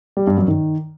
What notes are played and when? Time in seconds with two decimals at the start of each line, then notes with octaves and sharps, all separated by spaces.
0.17 G3
0.27 G2
0.37 F#2
0.48 D#3